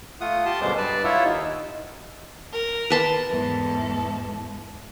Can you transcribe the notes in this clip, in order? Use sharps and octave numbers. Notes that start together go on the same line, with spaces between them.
A3 F4 F#5 D#6
G4 A5 C6
F#2 B2 D3 G3 G#3 C5
G2 B4 D5 A5
E4 F4 C#5 E5 F#5
D#2 D#4
A#4
B4 A5 C6
E2 G#2 A4